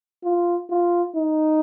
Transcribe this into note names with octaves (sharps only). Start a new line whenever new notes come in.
F4
F4
D#4